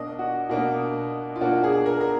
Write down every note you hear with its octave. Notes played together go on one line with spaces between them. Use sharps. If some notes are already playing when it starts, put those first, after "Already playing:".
Already playing: B2 A#3 D4 D#5
F#4
B2 A#3 D4 F#4
F4
B2 A#3 D4 F#4
G#4
A#4
A#4